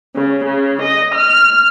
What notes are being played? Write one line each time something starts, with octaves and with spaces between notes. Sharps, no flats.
C#3
C#3
D#5
F6